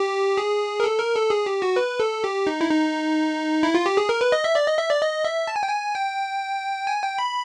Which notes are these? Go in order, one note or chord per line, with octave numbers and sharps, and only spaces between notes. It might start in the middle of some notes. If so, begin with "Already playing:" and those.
Already playing: G4
G#4
A#4
A4
A#4
A4
G#4
G4
F#4
B4
A4
G4
D#4
E4
D#4
E4
F4
G4
G#4
A#4
B4
D#5
E5
D5
D#5
E5
D5
D#5
E5
A5
G#5
G5
G#5
G5
G#5
G5
B5